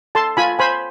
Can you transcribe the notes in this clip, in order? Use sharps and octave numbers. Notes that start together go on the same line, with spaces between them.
A4 A5 C6
F4 G#5 B5
C5 G#5 B5